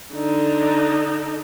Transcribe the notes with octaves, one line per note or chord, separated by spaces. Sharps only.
D3 D#4